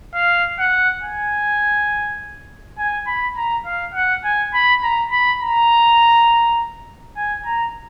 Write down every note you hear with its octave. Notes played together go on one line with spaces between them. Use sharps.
F5
F#5
G#5
G#5
B5
A#5
F5
F#5
G#5
B5
A#5
B5
A#5
G#5
A#5